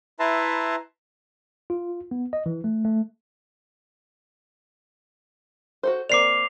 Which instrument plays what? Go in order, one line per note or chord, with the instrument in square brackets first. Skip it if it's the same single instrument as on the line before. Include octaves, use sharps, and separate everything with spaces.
[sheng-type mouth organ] E4 B4 E5 A5 A#5 C6
[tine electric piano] F4
B3
D#5
E3
A3
A3
[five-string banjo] F#4 A4 C5
[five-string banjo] A#3 C4 D5 [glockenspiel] D6 C7 F7